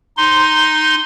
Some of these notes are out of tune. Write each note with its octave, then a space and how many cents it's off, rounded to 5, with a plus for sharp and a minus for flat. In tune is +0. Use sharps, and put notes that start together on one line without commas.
D#4 +0 C6 +0